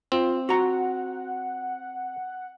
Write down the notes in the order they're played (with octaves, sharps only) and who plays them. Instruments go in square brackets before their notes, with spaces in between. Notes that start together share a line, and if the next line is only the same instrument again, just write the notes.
[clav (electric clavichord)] C4 [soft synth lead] F4
[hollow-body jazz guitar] F#4 A#5 [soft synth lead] F#5